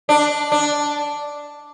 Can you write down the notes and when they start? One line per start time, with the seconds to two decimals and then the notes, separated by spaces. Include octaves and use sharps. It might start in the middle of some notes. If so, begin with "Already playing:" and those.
0.09 D4
0.52 D4